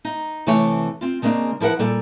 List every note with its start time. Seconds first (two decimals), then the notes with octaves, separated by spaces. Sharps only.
0.05 D#4
0.47 C3 E3 A3 C4 C#5 G#5
1.01 C4 F4
1.22 C#3 G#3 A#3 C4 D4
1.60 F3 E4 A#4 B4 F#5
1.79 A#2 G3 F4 A4